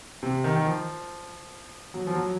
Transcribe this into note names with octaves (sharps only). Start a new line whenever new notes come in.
C3
D#3
D#3
F3
F#3
F3
F#3